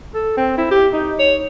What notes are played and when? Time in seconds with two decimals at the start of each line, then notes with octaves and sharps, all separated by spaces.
0.14 A4
0.37 C4
0.58 E4
0.71 G4
0.93 D#4
1.19 C#5